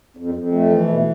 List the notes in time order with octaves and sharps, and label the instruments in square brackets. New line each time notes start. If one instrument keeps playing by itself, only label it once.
[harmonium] F2
F2
A3
E3
B2